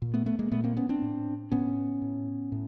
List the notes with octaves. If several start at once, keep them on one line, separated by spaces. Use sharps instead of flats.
A#2
A3 B3
A3 B3
G#3 A#3
A#2 A3 B3
A#3 C4
B3 C#4
C4 D4
A2
A2 B3 C#4
A2
A2